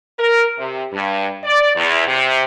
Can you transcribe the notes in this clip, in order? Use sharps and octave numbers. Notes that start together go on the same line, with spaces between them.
A#4
C3
G2
D5
E2
C3